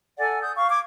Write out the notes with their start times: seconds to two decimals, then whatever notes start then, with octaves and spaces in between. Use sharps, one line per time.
0.19 A4 D5 F#5 G#5
0.42 D#6 G6
0.56 F5 C#6
0.70 D6 G#6